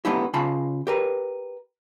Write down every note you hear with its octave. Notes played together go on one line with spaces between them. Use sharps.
A3 B3 D4 E4 G4
C#3 F4 A5 B5
G4 A#4 B4